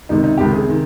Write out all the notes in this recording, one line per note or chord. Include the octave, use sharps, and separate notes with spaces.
C#2 C3 D#3 D#4
D#4
C#2 C3 D#3 G4
G#4
C3 D#3